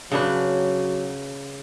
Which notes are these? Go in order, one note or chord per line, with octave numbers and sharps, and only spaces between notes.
C#3 F#3 D4 B4